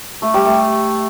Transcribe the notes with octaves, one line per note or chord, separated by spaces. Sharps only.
A3
G3
A3